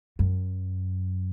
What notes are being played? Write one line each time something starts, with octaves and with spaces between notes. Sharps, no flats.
F#2